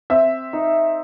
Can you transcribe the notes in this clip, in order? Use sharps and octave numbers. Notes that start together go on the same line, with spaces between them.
C4 E5
D#4